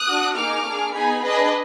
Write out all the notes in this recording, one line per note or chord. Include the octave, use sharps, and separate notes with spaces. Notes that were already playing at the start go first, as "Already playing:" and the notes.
Already playing: D#6 F#6
D4 F#4
A#3 D#4 G#4 D6 F6
A#3 D4 G#4
B3 D#4 G#4 G#5 B5
D4 G#4 B4 D#5